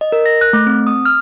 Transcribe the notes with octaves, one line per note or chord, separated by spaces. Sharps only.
D#5
A#4
A#6
F#6
A3
C4
D#6
F6